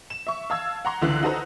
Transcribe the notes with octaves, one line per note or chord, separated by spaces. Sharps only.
E7
E5 C#6
F5 A5 E6 G#6
F#5 A#5 C6
C#2 D3 E3 F#6
D#4 F#4 A4 B4 C5 A#5